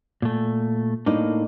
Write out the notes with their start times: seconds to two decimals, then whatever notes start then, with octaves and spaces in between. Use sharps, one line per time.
0.22 A#2 A3
1.06 A2 A#3 D4 D#4